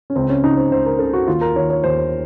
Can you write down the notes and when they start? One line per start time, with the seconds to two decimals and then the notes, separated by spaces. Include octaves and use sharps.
0.10 C#4
0.16 C#2 C4
0.30 C#4
0.44 C#3 D#4
0.57 C5
0.71 C#2 C5
0.86 A#4
0.99 C#3 A4
1.14 F#4
1.28 D#2 F4
1.41 A#4
1.55 D#3 C#5
1.70 C#5
1.84 D#2 C5